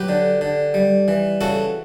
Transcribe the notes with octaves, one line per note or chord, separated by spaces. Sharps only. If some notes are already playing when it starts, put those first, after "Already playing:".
Already playing: F#3 G4 B4
D3
D3
G3
E3
C#3 F#4 A4